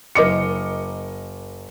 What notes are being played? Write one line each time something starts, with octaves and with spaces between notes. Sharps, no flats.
F#1 A#4 D#5 D6 C#7